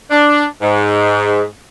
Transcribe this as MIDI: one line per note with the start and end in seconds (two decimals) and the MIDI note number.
0.11 0.45 62
0.62 1.43 44